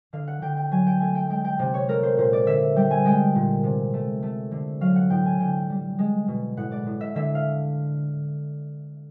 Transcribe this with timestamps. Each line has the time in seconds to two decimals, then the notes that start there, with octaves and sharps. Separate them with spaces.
0.13 D3 F5
0.28 F#5
0.42 D3 G5
0.57 G5
0.71 F#3 G#5
0.87 G5
1.00 A3 G#5
1.15 G5
1.30 G#3 G5
1.44 G5
1.59 C3
1.74 C#5
1.88 A3 A#4
2.03 C5
2.18 A#2 C5
2.33 D5
2.47 D3 E5
2.76 G3 G5
2.91 G#5
3.05 G#3 G5
3.35 A#2
3.64 C3
3.94 A3
4.23 A3
4.51 D3
4.81 F#3 F5
4.96 F#5
5.10 A2 G5
5.26 G#5
5.40 D3 G5
5.70 G3
5.99 G#3
6.28 B2
6.57 A2 F#5
6.72 D5
6.86 A2
7.01 E5
7.15 D3 E5
7.35 F5